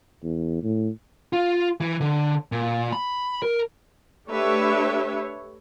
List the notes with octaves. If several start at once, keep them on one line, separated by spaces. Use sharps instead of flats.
E2
A2
F4
E3
D3
A#2
B5
A#4
A3 D4 G4 B4 C#5 E5